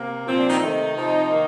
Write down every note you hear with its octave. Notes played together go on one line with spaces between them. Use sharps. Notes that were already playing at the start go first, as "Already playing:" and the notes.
Already playing: C3 A#3
A#2 F3 C4
D4
D#4
C3 D#3 A3 D#4
C3 F3 C4
D#3 A#3